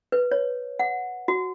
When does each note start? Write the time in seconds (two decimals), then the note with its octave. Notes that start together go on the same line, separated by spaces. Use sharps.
0.12 B4
0.31 C#5
0.79 F#5
1.28 F#4